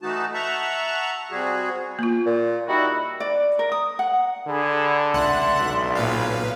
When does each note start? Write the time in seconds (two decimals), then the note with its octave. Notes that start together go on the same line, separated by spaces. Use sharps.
0.02 E3 A3 D#4 F#4 A5
0.34 E5 F#5 A5 A#5 C#6
1.31 C3 G3 F#4 G#4
1.99 A#3 F4
2.26 A#2
2.68 G3 D#4 E4 F#4
3.20 D5
3.59 A#4
3.72 D#6
3.99 F#5
4.47 D3 G#4 A5 B5
5.13 C#2 D5 E5 F#5 C6 F#6
5.60 B1
5.95 A#2 B4 F5